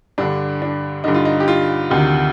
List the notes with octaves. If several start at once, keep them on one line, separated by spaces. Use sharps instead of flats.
G2 D3 D4
D4
G2 D3 D#4
F4
D#4
G4
F4
D2 C3 D#3